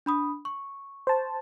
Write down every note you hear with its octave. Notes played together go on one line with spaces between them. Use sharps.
D4 B5 D#6
C#6
C5 A5